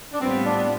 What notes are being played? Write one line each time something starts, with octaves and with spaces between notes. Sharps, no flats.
D4
A2 G3 B3 C4 F4
D4